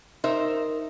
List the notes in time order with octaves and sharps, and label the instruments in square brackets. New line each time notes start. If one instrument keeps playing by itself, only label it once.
[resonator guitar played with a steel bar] D#4 A#4 C5 E5